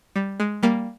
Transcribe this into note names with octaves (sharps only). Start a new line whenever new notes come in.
G3
G#3
G3 A#3